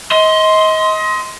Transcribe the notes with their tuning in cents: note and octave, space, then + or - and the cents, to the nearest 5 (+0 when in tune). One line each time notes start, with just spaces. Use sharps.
D#5 +30 C6 +0